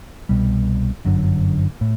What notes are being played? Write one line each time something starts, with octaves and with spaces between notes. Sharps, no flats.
C2 B2 G3
G1 F#2 D3
A2